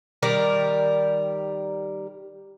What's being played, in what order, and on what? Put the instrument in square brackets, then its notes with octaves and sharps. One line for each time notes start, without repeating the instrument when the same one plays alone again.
[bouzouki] D#3 G3 A#4 D5